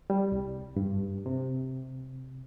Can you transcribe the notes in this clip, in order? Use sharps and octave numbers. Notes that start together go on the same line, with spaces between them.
G3
C2
G2
C3